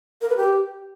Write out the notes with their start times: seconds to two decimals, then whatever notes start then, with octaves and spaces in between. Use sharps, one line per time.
0.21 A#4
0.29 B4
0.37 G4